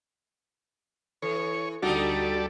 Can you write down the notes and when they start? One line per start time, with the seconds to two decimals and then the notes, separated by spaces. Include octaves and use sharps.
1.22 E3 A4 C#5
1.83 D2 D3 G3 A3 D#4 F#4 A4 D5